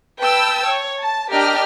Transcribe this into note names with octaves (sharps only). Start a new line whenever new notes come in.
B4 G5 A5 E6
C#5
A5
D4 G4 A#4 D#5 F6